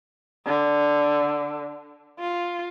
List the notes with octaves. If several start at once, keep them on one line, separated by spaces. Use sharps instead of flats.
D3
F4